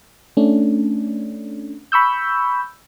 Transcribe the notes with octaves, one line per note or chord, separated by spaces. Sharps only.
A3 C#4 D4
B5 C#6 E6 G6